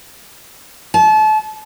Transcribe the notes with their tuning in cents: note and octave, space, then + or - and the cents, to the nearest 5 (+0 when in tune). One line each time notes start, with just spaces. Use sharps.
A5 -30